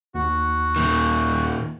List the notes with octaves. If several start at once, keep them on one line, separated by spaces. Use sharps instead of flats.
D#2 F#4
A#2 D#3